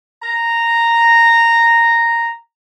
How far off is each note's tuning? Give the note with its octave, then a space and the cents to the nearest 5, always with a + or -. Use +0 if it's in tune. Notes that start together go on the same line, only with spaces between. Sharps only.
A#5 -5